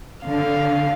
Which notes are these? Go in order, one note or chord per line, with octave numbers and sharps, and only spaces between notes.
D3 F5